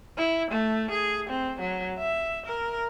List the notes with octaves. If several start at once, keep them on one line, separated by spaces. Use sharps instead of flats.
E4
A3
G#4
C4
F#3
E5
A#4